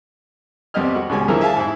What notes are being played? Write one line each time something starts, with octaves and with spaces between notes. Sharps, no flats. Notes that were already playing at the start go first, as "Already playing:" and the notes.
C2 F2 G3 B3 D#5 F6
F#4
C#2 B2 G3 G#3 C#4 G#5
D3 E3 F3 E4 G#4 A#4
E5 F5 G#5 A5
G#2 E4